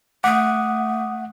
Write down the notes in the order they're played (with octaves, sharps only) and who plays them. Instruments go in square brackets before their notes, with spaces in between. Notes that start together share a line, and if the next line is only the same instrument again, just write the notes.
[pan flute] A3 [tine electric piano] F#5 [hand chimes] D6 D#6